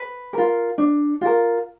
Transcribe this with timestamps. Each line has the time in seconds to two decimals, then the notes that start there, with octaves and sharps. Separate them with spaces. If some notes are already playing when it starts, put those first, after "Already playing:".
Already playing: B4
0.33 F4 A#4
0.78 D4
1.21 F4 A#4